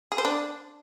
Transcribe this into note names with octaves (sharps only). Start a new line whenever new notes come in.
G#4
C5
D4